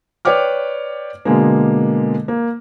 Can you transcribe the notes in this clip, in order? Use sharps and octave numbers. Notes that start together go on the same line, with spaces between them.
B4 C#5 D5 G5 D6 F6
B2 D3 G#3 A#3
A#3